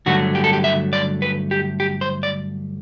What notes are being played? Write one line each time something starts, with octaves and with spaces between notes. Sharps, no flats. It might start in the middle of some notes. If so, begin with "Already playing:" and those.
G2 D3 F#3 A3 F#4
G4
A4
G4
E5
D5
B4
G4
G4
C5
D5